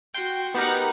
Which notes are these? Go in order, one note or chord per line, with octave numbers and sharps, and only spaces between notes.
F#4 G5 C6
B3 D#4 G4 A#4 F#5